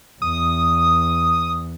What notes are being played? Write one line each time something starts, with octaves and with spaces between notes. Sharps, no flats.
E2 D#6